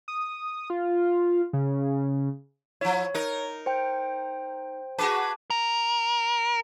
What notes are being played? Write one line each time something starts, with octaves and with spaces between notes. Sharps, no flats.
D#6
F4
C#3
F3 E4 C#5
D#4 A#4
C5 G5
F#4 G#4 B4 A5 D6
A#4